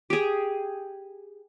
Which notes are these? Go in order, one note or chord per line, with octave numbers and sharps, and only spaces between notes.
G4 G#4